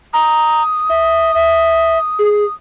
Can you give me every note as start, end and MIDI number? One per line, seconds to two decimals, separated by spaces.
0.14 0.62 82
0.14 2.53 87
0.90 1.34 76
1.35 1.98 76
2.19 2.44 68